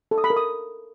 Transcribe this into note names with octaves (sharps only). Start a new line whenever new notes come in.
A4
D#6
B5
A#4
D#6